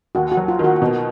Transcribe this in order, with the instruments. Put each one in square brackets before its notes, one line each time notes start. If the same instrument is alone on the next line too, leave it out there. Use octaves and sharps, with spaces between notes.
[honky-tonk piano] D#2 [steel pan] F#4
[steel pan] F#4
[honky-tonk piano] F#3
[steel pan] F4
[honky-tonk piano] D#3 [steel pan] F#4
[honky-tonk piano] B2